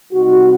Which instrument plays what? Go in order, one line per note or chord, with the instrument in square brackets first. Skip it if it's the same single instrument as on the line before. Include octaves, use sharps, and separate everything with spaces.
[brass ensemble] C3 G3 C4 D#4 F#4